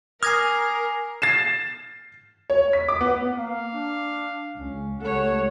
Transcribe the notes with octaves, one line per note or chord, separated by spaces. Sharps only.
A#4 G#5 D6 D#6 F6 G#6 A#6 C7
A6 C7 E7
C#5
B6
D6
B3
A#3 F5
D4
C#2 C#4
C#2 G3 A3 A4 C#5 F#5